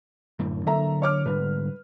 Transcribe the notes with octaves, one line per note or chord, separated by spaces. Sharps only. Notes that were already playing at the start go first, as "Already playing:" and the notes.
F#2 A2 D3
D3 F#3 A#3 A4 E5 A#5
C#5 D6 F6
G#2 D3 G3 B4